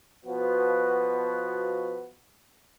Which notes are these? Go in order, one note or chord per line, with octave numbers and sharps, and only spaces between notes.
B2 F3 B3 F#4